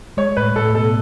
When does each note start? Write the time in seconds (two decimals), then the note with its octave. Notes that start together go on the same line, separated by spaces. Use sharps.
0.17 G#3 C#5
0.37 A2 B4
0.56 A2 A4
0.75 B2 A4